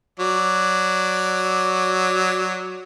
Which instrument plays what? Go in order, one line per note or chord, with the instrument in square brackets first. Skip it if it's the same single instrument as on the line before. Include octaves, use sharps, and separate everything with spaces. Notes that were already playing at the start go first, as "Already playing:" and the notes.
[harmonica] F#3 D5